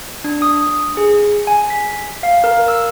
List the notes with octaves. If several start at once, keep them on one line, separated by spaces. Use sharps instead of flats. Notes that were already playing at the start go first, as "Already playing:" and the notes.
D4
D#6
G#4
G#5
B6
F5
A#4
E6